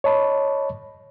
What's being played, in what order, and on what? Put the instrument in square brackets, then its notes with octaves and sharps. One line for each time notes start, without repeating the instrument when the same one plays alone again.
[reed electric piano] C#5 D#5 A5 B5